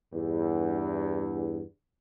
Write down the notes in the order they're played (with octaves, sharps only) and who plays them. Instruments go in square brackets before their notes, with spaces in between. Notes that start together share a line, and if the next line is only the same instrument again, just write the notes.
[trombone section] E2 G2